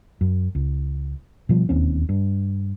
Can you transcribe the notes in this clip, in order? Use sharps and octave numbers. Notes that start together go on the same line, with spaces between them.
F#2
C#2
B2 F3 G3
E1 D#2 C4 C#4
G2